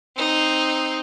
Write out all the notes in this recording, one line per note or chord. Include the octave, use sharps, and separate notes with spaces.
C4 D#4